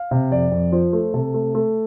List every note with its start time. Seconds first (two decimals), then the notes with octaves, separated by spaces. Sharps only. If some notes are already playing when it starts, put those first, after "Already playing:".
Already playing: F5
0.11 C3
0.31 F2 D5
0.52 F2
0.72 F3 C5
0.93 A3
1.14 C3 A4
1.34 A3
1.55 A3